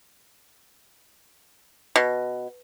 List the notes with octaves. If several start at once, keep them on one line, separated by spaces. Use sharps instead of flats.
B2